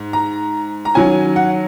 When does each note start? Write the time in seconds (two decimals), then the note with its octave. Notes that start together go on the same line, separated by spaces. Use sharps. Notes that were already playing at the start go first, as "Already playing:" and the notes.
Already playing: G#2
0.13 A#5
0.85 A#5
0.94 D#3 F#3 C#4 G#5
1.36 F#5